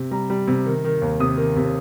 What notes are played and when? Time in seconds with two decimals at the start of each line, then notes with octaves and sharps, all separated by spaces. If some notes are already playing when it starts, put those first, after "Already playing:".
Already playing: C3
0.11 G3 A#5
0.30 G3
0.48 C3
0.66 D#3
0.84 D#3
1.02 D#2
1.20 C3 D#6
1.37 D#3
1.56 C3